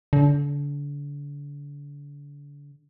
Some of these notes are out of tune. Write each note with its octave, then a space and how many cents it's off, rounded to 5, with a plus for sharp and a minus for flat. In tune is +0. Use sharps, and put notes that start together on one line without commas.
D3 -35